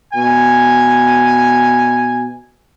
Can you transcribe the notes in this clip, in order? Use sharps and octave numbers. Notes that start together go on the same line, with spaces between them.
B2 G#5